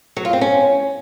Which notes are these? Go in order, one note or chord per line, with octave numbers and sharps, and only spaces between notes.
F#3
F4
C4
C#4